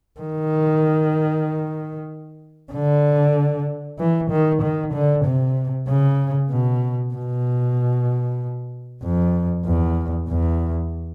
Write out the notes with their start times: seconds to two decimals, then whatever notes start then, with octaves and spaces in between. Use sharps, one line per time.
0.21 D#3
2.73 D3
3.99 E3
4.30 D#3
4.62 D#3
4.93 D3
5.25 C3
5.88 C#3
6.51 B2
7.14 B2
9.03 F2
9.66 E2
10.28 E2